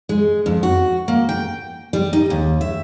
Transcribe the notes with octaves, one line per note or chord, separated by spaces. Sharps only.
G#3
F2
F#4
A#3
G5
G3
D#4
D#2
E5